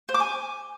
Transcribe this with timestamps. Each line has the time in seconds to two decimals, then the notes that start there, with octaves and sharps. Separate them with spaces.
0.09 C5
0.14 D6
0.20 G#5